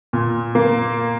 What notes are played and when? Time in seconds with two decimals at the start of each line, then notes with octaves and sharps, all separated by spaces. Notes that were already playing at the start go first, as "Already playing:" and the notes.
0.13 A#2
0.55 A#3